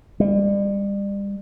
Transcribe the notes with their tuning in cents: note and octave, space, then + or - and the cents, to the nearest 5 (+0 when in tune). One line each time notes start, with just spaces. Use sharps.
G3 +35